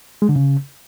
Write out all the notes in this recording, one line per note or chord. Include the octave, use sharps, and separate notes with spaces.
G#3
D3
C#3